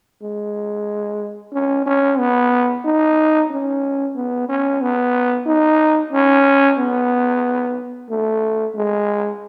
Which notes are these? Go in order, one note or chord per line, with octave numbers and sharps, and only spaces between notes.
G#3
C#4
C#4
B3
D#4
C#4
B3
C#4
B3
D#4
C#4
B3
A3
G#3